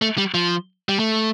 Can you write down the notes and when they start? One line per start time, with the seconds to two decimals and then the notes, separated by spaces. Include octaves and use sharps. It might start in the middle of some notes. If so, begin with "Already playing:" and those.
0.02 A3
0.18 G3
0.34 F3
0.89 G3
0.99 A3